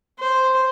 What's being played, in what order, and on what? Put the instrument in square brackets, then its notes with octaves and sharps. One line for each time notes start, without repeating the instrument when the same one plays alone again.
[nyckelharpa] C5